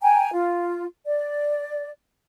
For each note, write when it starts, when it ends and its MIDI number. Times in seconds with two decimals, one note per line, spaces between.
0.02 0.30 79
0.02 0.30 80
0.02 0.30 82
0.32 0.85 65
1.06 1.89 74